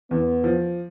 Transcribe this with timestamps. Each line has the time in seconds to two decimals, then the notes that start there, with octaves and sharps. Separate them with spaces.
0.11 E2 B3
0.44 F3